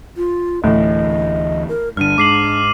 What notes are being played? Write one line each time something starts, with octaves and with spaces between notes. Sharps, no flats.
F4
D2 A2 E3 D#5
A#4
G2 D3 D4 F6 D#7
G#2 D6 C7 F#7